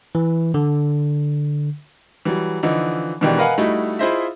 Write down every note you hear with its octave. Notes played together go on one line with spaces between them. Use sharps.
E3
D3
E3 F#3 G3
D3 E3 F3 D#4
B2 D#3 E3 G#3 D4 G4
A#4 B4 D#5 F5 F#5 G#5
G3 A3 D#4 E4 F#4
E4 F4 G#4 C5 D#5 E5